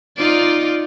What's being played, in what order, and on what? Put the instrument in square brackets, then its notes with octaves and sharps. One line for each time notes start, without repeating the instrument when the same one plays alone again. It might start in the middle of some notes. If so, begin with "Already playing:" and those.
[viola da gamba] D#4 F4 D5